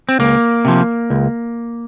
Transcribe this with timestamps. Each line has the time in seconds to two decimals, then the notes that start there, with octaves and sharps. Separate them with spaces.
0.09 C4
0.19 C#2 A#3
0.65 C3 F3
1.10 C#2